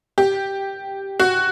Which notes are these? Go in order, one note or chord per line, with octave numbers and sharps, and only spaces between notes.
G4
F#4